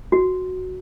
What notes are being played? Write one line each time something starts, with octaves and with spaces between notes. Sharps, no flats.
F#4